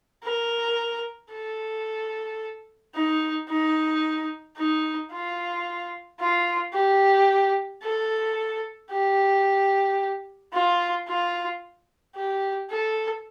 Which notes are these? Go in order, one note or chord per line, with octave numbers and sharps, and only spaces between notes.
A#4
A4
D#4
D#4
D#4
F4
F4
G4
A4
G4
F4
F4
G4
A4